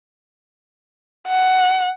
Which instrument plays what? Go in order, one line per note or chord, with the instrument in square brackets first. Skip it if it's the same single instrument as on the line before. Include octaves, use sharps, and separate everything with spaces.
[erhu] F#5